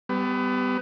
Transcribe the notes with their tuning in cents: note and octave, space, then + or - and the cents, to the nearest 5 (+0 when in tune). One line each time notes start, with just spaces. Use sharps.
G3 +0 B3 +30